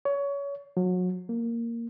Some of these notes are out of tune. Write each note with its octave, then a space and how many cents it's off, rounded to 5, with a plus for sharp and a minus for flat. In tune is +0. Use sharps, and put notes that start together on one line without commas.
C#5 +25
F#3 -30
A#3 -5